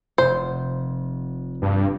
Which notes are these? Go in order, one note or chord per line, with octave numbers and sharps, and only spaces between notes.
F1 C5
G2